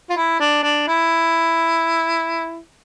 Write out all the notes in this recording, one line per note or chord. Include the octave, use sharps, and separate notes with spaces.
F4
E4
D4
D4
E4